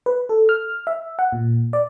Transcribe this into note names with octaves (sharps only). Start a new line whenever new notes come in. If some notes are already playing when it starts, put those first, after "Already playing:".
B4
A4
F6
E5
F#5
A#2
D5